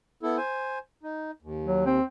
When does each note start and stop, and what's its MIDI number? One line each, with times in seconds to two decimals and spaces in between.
0.23 0.37 59
0.23 0.37 64
0.23 0.37 69
0.37 0.78 72
0.37 0.78 80
1.03 1.31 63
1.42 1.99 39
1.66 1.83 54
1.86 2.03 60